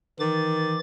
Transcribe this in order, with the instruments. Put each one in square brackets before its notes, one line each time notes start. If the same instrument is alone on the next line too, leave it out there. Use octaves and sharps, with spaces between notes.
[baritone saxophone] D#3 [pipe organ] E3 D6 A6